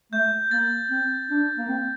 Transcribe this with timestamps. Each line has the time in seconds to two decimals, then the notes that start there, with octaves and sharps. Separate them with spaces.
0.12 A3 G6
0.51 A#3 A6
0.90 C4
1.30 D4
1.58 A#3
1.69 C4